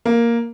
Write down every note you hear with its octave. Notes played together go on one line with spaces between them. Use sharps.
A#3